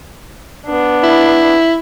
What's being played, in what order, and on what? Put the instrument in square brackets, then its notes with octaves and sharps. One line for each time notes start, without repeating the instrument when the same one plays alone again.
[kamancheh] B3 D4
[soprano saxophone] E4